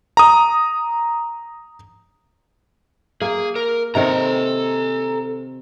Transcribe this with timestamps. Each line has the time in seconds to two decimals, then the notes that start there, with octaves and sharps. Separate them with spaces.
0.17 A#5 D#6
3.21 A#3 G#4
3.56 A#4
3.95 C3 D#3 C4 A4 A#5